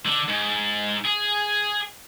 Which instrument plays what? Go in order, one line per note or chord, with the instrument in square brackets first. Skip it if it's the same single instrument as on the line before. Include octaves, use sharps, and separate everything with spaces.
[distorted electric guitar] D3
G#2
G#4